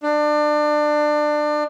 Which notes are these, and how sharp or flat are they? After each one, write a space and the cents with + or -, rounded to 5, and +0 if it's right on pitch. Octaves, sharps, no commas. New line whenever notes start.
D4 +25